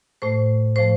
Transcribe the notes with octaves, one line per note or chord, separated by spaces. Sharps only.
A2 A3 C5
A2 F3 A3 C5